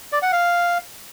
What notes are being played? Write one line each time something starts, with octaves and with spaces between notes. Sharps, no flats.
D5
F#5
F5